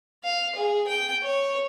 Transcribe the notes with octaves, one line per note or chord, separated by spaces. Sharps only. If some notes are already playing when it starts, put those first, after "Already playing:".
F5
G#4
G5
C#5